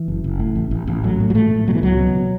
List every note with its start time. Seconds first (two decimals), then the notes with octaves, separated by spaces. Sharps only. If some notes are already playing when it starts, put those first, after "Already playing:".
Already playing: E3
0.08 F#1
0.24 F#1
0.39 A2
0.56 A1
0.71 A1
0.87 A1
1.04 A2 F#3
1.20 A2
1.30 F#3
1.35 A2 A3
1.51 A2
1.67 B2 F#3
1.75 E3
1.83 C#2 F#3
1.99 B2